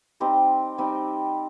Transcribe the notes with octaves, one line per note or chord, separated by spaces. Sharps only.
G3 C4 D#4 G4
G3 C4 D#4 G4